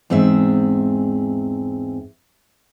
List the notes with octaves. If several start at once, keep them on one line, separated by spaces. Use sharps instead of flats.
E2 G#2 C4 G#4 E5